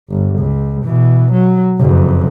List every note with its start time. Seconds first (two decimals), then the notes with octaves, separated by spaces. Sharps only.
0.10 G1
0.39 C#2
0.85 B2 E3
1.32 F#3
1.79 F#1 F2